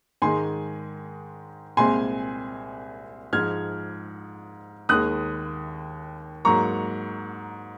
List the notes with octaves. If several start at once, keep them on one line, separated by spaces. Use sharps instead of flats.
G#2 D#3 G#3 G#5 C6
C2 A#2 G#3 C4 G#5 C6
G#2 F3 G#3 F6 G#6
D#2 D#3 G#3 D#6 F#6
G#2 F#3 A#3 A#5 C#6